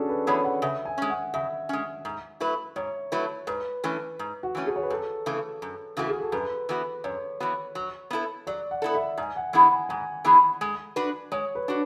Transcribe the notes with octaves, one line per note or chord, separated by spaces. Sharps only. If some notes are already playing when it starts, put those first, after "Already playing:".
Already playing: C#4 D4 F#4 G#4 A4
B4
E3 B3 E4 G#4 C#5
F#5
C#3 E5
G#5
G#3 C#4
F#5
C#3 E5
G#3 C#4
G#2
F#3 A3 E4 B4
G#2 C#5
F#3 A3 E4 B4
G#2 B4
E3 A3 C#4
G#2
F#4
E3 A3 C#4
G#4
C#5
B4
F#2 A4
C#3 E3 A3
F#2
C#3 E3 A3 F#4
G#4
A4
F#2 B4
E3 B3 F#4
F#2 C#5
E3 B3 F#4
F#3
B3 E4 A4
F#3 D5
F#5
B3 E4 A4
E5
G#2 G#5
F#5
E3 B3 E4 G#4 F#5
G#5
G#2 G#5
E3 B3 E4 G#4
G#3
D4 F#4 B4
G#3 C#5
B4
D4 F#4